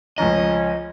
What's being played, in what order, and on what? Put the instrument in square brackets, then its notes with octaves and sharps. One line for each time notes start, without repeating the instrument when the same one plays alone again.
[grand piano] C#2 F3 A#5 [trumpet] C#4 [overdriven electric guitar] D#5